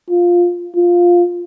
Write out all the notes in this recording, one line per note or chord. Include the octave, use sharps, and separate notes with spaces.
F4
F4